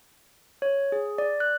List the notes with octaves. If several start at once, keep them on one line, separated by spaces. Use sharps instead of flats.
C#5
G#4
D5
F#6